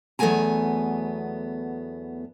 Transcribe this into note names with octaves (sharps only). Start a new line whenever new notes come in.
E2 F#3 A3 B3 G#5 A#5